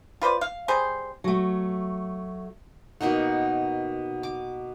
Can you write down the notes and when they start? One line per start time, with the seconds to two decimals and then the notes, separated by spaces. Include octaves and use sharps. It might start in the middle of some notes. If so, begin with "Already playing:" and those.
0.22 F4 B4 C5 D5
0.41 F5
0.68 G3 G#4 C5
1.24 F#3 A3
3.01 B2 A#3 D#4 F#5
4.23 D6